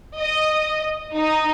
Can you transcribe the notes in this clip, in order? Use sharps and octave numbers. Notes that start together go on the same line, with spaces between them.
D#5
D#4